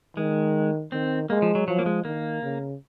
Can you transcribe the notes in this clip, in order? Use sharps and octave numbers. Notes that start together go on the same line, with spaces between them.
D#3 G#3
D#3 C4
G#3 A#3
F3
F#3
F3 F#3
A#3
G#3
D#3 A#3
C#3